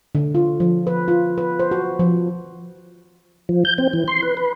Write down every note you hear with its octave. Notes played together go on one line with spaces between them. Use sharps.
D3
F4
F3
B4
F4
B4
C5
F#4
F3
F3
G6
C4
E3
C6
B4
B4